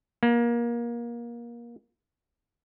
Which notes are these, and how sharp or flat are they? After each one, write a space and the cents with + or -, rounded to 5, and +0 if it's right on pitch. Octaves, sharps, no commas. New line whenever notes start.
A#3 +25